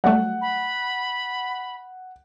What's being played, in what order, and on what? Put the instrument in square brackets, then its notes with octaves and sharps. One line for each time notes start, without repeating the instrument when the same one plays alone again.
[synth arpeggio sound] F#3 G3 A3 [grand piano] F#5
[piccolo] B5